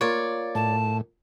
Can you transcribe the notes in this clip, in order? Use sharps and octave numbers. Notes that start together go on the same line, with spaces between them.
A#3 F4 C#5 D5
A2 A5